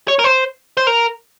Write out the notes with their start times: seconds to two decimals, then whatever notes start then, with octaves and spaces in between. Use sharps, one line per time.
0.08 C#5
0.19 A#4
0.25 C5
0.77 C5
0.87 A#4